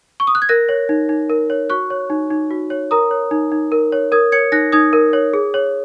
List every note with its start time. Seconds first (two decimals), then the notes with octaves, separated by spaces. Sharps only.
0.20 C#6
0.27 D#6
0.35 F#6
0.42 G#6
0.49 A#4 F#6 A#6
0.69 C#5
0.89 D#4
1.09 D#4
1.30 A#4
1.50 C#5
1.70 F#4 C#6 F#6
1.90 C#5
2.10 D#4
2.31 D#4
2.51 F#4
2.70 C#5
2.91 A#4 A#5 D#6
3.11 C#5
3.31 D#4
3.52 D#4
3.72 A#4
3.92 C#5
4.12 A#4 D#6 G#6
4.32 C#5 G#6 C#7
4.52 D#4 F#6 A#6
4.72 D#4 D#6 G#6
4.93 A#4
5.13 C#5
5.34 G#4
5.54 C#5